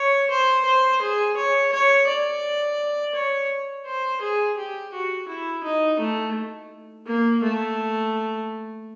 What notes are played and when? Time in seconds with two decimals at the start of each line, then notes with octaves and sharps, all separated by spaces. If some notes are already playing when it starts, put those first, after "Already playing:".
Already playing: C#5
0.30 C5
0.65 C5
1.01 G#4
1.37 C#5
1.73 C#5
2.07 D5
3.15 C#5
3.85 C5
4.21 G#4
4.57 G4
4.93 F#4
5.28 E4
5.64 D#4
5.99 A3
7.06 A#3
7.43 A3